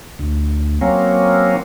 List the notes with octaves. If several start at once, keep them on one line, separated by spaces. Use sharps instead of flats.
D2
F#3 A#3 C4 C#4